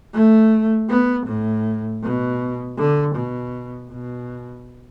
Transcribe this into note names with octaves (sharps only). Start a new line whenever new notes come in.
A3
B3
A2
B2
D3
B2
B2